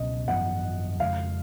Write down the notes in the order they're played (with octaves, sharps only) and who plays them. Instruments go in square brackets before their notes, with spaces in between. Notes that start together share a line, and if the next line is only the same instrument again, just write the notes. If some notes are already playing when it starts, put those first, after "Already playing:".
Already playing: [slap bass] C#2 B2 F#3 C#4 [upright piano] D#5
[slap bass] G#1 F#2 F3 B3 [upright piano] F#5
[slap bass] F2 C#3 G#3 [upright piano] F5